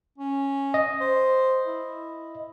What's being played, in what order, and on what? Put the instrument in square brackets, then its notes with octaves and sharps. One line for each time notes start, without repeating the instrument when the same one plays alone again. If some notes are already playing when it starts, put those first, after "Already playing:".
[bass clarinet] C#4
[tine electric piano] D#5
[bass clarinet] C5
E4